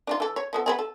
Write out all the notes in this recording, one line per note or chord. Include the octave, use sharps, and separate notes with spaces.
D4 D#4 F4
E3 A4
C#5
F3 B3 A4
B3 C4 G#4
A4